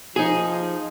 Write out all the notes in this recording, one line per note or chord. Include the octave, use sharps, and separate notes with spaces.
F3 D#4 G#4